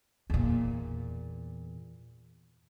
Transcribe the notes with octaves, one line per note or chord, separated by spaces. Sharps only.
E2 A#2